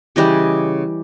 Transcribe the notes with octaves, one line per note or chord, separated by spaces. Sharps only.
C#3 E3 G3 D#5